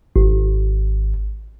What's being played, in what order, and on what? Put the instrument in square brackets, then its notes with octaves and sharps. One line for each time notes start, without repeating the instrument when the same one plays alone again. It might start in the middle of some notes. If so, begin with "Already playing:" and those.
[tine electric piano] G#1